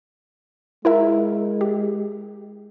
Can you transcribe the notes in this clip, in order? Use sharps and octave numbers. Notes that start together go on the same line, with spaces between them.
G#3 E4 A#4 E5
G4